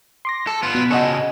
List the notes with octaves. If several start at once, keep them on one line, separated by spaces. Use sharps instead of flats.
C6 D6 A#6
A4 C#7
B3 F4
B2 F#6 B6
C#3 F#4 A4 D#5 C#6